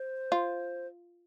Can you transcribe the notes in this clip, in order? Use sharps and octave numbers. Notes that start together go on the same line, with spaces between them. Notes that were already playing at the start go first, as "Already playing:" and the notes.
Already playing: C5
F4